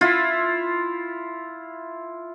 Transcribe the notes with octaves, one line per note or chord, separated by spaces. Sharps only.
E4 F4